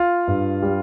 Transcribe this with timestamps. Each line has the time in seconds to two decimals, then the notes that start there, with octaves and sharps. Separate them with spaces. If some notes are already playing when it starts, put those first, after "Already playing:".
Already playing: F4
0.28 G2
0.62 G3